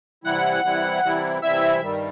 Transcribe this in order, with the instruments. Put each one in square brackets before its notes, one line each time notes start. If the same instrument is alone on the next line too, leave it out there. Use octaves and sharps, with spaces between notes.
[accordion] C3 E3 G3 C4 E4 [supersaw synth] F#5
[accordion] C3 E3 G3 C4 E4
C3 E3 G3 C4 E4
[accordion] C3 E3 G3 C4 E4 [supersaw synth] E5
[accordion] G2 D#3 G3